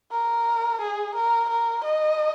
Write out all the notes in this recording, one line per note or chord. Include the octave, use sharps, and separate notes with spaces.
A#4
G#4
A#4
A#4
D#5